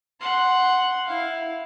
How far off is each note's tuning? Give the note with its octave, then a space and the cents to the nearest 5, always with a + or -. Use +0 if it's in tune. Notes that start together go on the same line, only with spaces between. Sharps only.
F#5 +0 C6 +0
E4 +0 F5 +5